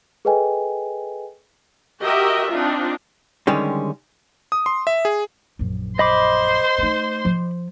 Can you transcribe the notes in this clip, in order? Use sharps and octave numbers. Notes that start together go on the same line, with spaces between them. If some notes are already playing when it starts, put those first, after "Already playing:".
G#4 A4 B4 D#5 G5 G#5
F#4 G4 A#4 D#5 E5
C4 D4 D#4 F4
D3 D#3 G3 G#3 C#4
D#6
C6
E5
G#4
A#1 F#2
C5 D#5 B5 C6 D6
A3 D#4
F3